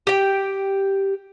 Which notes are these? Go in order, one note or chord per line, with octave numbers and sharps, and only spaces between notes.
G4 G5